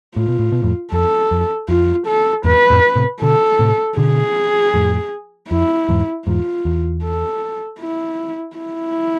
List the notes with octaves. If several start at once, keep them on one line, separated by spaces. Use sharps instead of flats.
A2 F4
B2
A2
B2
F2 A2
F2 A4
F2
F2 F4
A4
E2 G#2 B4
F2 A2
A2 C3
B2 D3 A4
A2 C3
B2 D3 G#4
F2 A2
F2 E4
E2 G#2
E2 G#2 F4
E2
A4
E4
E4